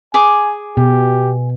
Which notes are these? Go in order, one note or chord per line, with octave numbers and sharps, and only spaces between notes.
G#4 G#5 D6
B2 G4